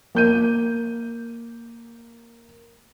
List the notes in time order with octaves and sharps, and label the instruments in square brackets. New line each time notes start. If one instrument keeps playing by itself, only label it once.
[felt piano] A#3 G6 D#7